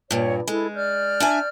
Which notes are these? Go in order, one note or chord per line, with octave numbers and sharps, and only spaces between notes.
G2 A#2 C#5
G#3 E4 A4
D5 F6 G6
D4 E5 G#5